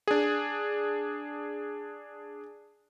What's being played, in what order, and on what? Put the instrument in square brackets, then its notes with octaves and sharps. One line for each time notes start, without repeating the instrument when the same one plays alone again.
[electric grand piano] D4 G#4